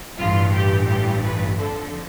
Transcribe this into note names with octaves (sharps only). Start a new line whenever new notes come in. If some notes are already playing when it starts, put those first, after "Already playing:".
A1 G2 E3 F4
G4
G4
B4
F2 D3 F3 A4